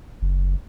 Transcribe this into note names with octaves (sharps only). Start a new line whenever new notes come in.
F#1